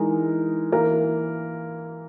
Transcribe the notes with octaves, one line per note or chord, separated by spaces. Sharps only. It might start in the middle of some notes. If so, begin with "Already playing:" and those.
Already playing: E3 G#3 D#4 A#4
E3 A#3 E4 A#4